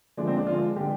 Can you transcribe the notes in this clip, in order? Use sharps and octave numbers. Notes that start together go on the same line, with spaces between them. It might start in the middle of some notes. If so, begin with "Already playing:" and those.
D3 F3 G#3 D4
C4
D4
D3 F3 G#3 F4
D3 G#3 G4